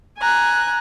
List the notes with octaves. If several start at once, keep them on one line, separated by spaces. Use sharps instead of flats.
G#5 A#5 F#6